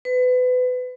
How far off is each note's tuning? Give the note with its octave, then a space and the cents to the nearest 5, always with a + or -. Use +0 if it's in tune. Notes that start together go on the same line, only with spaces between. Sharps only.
B4 +30